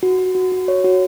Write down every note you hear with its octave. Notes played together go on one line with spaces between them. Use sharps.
F#4
F#4
F#4
F#4
C#5
F#4